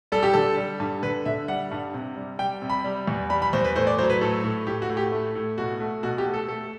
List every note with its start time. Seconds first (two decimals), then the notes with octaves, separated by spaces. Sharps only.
0.12 G3 A4
0.23 G4
0.33 D3 A4
0.57 G3
0.80 G2
1.03 D3 B4
1.25 D3 E5
1.48 G3 F#5
1.71 G2
1.94 C3
2.16 G3
2.39 G3 G5
2.62 C3
2.70 B5
2.84 G3
3.08 E2
3.30 G3 B5
3.42 B5
3.53 E2 C5
3.65 B4
3.76 A2 C5
3.87 D5
3.98 F#3 C5
4.10 B4
4.21 A2 A4
4.44 A2
4.67 A2 G4
4.82 F#4
4.90 A2
4.97 G4
5.12 A3
5.35 A2
5.58 B2 F#4
5.80 A3
6.03 B2 F#4
6.18 G4
6.26 A3
6.34 A4
6.48 A3 A4